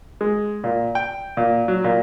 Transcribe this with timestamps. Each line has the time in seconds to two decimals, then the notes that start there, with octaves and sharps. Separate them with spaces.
0.21 G#3
0.64 A#2
0.95 G5
1.37 A#2
1.68 F#3
1.84 A#2